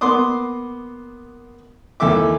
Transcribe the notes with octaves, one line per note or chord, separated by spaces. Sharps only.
A#3 B3 C6 D6 D#6
D#2 E3 A4 E5 D6